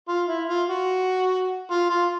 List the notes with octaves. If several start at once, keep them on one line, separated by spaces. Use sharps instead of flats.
F4
E4
F4
F#4
F4
F4